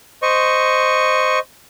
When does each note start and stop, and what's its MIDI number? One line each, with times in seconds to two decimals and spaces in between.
0.22 1.39 72
0.22 1.39 75
0.22 1.39 85